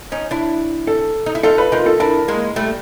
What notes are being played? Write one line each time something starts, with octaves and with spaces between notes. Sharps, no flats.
C#4 D#4
D4 E4
A4
D#4
E4
D#4 F4 A4
B4
D#4 F4 A#4
A4
D4 E4 A#4
G#3 A#3
G3 A3